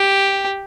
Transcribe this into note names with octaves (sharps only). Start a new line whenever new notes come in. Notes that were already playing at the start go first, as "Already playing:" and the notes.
Already playing: G4